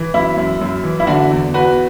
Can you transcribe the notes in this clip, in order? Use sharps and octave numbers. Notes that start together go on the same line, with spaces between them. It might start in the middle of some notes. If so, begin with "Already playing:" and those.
Already playing: E3
F#2 E4
F#2
F#2
E3
E4
D3 D4 F#4
E2
E2 F#4 B4